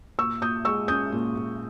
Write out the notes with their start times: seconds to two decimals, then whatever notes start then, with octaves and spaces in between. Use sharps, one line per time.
0.18 A#2 C#6 E6
0.41 A#2 D#6 G6
0.65 G#3 C#6 E6
0.88 C#4 D#6 G6
1.12 A#2
1.35 A#2